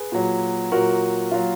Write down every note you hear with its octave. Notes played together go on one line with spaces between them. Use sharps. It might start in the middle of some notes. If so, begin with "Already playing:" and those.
Already playing: G#4 B4
A#2 F#3
A#2 F#3 F#4 A#4
A#2 F#3 F4